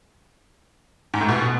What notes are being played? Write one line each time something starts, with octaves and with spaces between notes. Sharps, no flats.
G#2
A2
B2